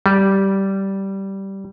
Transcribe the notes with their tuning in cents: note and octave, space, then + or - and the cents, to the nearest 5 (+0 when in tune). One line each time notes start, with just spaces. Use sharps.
G3 -10